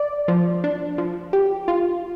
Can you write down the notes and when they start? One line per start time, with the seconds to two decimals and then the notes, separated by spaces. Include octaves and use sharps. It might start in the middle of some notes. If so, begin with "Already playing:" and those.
Already playing: D5
0.28 F3
0.64 D4
0.98 F3
1.33 G4
1.68 F4